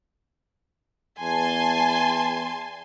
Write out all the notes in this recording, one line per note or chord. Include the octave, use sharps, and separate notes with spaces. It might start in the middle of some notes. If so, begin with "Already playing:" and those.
E2 G#5 A5 C6